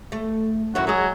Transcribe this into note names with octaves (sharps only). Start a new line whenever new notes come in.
A3
F#2 D#3 E4 F#4
F#3 G#3 G#4